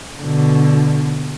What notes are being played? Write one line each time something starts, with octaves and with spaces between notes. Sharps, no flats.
B2 D3